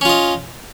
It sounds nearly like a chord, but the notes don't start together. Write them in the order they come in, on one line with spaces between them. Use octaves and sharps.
C#4 F4 D#5